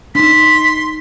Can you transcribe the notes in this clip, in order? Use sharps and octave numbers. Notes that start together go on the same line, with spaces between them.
D4 D#4 C6 B6